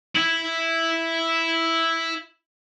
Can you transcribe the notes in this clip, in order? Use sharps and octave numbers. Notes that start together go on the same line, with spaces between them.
E4 E5